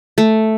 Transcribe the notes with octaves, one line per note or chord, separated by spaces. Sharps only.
A3